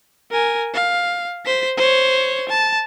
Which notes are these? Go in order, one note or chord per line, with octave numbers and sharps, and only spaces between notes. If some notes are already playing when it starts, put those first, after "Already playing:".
A#4 G#5
F5
C5 B6
C5 C#5
A5